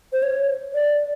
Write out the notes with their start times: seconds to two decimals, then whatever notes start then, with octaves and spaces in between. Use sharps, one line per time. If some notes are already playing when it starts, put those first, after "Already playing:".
0.13 C5
0.23 C#5
0.74 D5